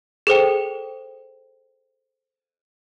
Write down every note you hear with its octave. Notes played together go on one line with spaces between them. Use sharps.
G#4 A4 C5 G5